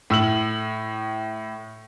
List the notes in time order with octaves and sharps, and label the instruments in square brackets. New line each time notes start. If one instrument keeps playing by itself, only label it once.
[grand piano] A2 E6 F#7